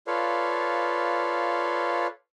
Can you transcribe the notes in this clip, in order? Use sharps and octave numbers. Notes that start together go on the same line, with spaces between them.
F4 A4 B4 C#5 D5 F5